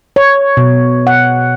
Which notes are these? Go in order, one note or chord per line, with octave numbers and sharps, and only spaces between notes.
C#5
B2
F#5